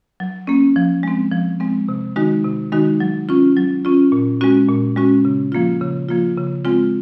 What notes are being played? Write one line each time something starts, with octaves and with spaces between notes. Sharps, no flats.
F#3
A#3 C#4
F3
G#3 C4
F3
G#3 C4
C3
D#3 G#3 D#4 F#4
C3
D#3 G#3 D#4 F#4
F#3
C#4 F4
F#3
C#4 F4
A#2
G#3 C#4 F#4
A#2
G#3 C#4 F#4
C#3
F3 A#3 F4
C#3
F3 A#3 F4
C#3
G#3 C4 F4